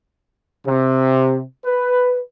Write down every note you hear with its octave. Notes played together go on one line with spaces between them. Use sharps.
C3
B4